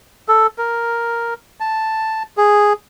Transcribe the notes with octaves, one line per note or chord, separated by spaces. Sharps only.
A4
A#4
A5
G#4